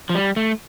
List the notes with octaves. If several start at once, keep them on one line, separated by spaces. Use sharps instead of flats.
F3
G3
A3